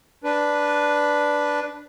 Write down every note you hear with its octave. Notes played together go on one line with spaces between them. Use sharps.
D4 B4